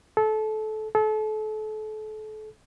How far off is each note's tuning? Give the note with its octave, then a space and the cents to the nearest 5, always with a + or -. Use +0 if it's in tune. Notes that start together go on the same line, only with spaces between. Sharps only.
A4 -25
A4 -35